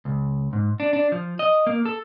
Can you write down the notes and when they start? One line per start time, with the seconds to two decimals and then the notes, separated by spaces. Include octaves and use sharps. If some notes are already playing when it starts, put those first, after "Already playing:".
0.05 C#2
0.53 G#2
0.80 D4
0.93 D4
1.12 F3
1.39 D#5
1.67 A#3
1.85 A4